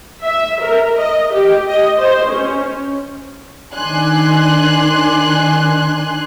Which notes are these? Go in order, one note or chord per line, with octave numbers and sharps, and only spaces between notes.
E5
A#4
D#5
G4
D#5
C5
C#4
D#3 D4 G#5 C6 F#6